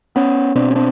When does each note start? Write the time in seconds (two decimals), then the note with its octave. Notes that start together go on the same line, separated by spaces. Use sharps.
0.16 B3 C#4
0.55 B2 C4 D4
0.71 C#4
0.75 C4 D4